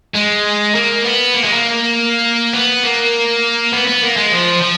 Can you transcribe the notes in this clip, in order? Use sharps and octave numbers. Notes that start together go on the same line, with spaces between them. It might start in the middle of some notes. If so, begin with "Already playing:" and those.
G#3
A#3
B3
A#3
G#3
A#3
B3
A#3
B3
B3
A#3
G#3
F3
F3